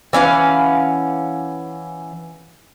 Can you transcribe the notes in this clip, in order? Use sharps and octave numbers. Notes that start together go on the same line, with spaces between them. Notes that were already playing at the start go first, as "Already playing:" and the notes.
E3 C#4 F5 F#5